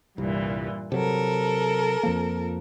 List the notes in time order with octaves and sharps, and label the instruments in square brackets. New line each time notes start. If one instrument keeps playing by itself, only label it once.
[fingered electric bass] C2 [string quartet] G2 A#2 E3
[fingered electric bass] C3 F#3 [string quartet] A4 A#4
[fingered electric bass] F2 F3 A#3